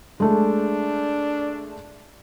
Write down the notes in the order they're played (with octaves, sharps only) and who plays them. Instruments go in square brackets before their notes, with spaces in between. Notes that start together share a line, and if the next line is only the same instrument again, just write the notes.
[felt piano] G#3 A3 [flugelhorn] D4